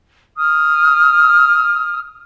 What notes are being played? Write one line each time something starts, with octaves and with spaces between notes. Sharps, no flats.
D#6 F6